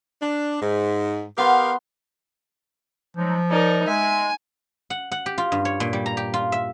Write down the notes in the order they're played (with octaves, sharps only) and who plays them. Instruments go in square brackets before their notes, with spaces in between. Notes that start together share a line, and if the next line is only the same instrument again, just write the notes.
[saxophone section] D4
G#2
[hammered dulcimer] B3 C6 [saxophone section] G4 A#4 F5
[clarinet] F3 [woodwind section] F#3 G#3 D#4
[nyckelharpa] D#4 A#4 [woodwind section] C#5 D5
[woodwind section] G#3 [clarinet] E5 [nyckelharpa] G#5
[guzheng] F#5
F#5
G4
F4
G2
C#5
A#2
G3
A#5
G4
F4
E5